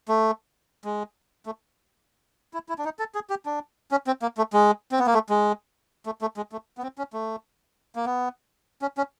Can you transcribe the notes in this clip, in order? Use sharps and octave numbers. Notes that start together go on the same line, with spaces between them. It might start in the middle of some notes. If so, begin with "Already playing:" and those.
A3
G#3
A3
E4
E4
D4
D#4
A4
G#4
G4
D4
C#4
C4
A#3
A3
G#3
C4
B3
A#3
A3
G#3
A3
A3
G#3
A3
B3
C4
C#4
A3
A#3
B3
C#4
C#4